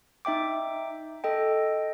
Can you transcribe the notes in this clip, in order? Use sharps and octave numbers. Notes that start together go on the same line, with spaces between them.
D#4 E5 G5 D6
A4 D#5 G5